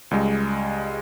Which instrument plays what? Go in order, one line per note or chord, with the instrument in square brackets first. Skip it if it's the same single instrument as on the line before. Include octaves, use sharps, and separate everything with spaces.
[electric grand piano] C#2 G3 G#3